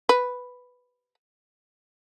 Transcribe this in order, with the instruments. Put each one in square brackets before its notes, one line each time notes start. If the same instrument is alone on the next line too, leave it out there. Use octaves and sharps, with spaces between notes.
[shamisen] B4